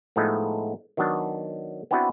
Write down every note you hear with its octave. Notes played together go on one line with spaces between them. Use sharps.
A2 F3 G#3 A3 B3 D#4
D#3 F#3 B3 D4
B3 C4 D4 E4 F#4 B4